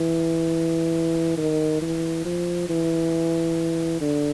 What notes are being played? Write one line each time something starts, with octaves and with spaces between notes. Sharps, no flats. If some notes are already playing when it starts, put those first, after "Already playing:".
Already playing: E3
D#3
E3
F3
E3
D3